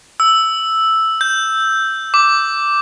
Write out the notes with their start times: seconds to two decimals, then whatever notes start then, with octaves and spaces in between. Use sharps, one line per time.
0.20 E6
1.21 G6
2.14 D6